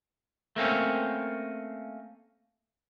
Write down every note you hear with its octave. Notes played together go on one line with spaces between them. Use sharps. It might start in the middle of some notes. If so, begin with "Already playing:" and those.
A3 A#3 C4 C#4